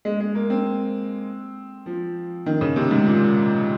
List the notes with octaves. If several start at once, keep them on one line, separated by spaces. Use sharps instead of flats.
G#3
G#3
A#3
C4
F3
D#3
C#3
C3
G#2
A#2